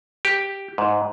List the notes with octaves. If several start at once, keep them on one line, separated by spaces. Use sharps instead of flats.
G4
G#2